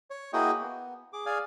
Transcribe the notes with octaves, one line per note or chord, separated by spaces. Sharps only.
C#5
A#3 E4 F#4 G#4 D#5 G5
B3
G#4 D6
G#4 D5 F5 G#5